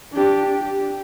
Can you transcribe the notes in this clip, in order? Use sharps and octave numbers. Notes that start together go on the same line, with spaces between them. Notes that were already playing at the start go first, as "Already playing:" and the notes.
D4 G4
G4